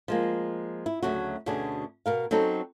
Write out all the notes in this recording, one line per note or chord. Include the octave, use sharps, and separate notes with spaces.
F3 G#3 A#3
E4
D2 C#3 F#3 A3 F#4
D2 B2 D3 C#4 D4 G#4
B2 A#4 F5
F#3 C4 C#4 D#4 A4